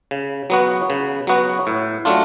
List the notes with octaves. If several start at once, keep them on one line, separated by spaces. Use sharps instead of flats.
C#3
F#3 B3 F#4
C#3
F#3 B3 F#4
A2
F#3 A3 D4 F4